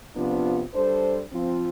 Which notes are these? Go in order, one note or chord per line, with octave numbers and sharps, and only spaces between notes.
C3 F3 B3 D4 F4
G3 D4 A4 C5
F3 C4 F4